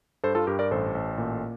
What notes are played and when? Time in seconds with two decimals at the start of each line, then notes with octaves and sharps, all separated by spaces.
0.24 G2 A4 C5
0.35 F4 A4
0.47 G2 G4 A#4
0.59 A#4 D5
0.71 A1 A4 C5
0.95 A1
1.18 A#2